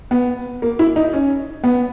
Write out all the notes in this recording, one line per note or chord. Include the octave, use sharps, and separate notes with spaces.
B3
A#3
E4
D#4
C#4
B3